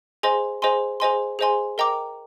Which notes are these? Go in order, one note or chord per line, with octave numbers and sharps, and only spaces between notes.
G#4 C5 D#5 G#5 C6
G#4 C5 D#5 G#5 C6
G#4 C5 D#5 G#5 C6
G#4 C5 D#5 G#5 C6
A#4 D#5 G5 A#5 D6